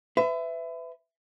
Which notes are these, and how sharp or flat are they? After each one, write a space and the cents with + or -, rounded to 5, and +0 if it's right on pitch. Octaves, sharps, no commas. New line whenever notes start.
B4 +35 E5 +5